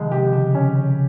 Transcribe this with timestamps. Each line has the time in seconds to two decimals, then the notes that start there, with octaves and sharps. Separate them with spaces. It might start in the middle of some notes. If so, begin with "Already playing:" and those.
Already playing: C2 C3 D#3 F3 G#3
0.12 C3 G4
0.33 C#3
0.54 C#3 C#4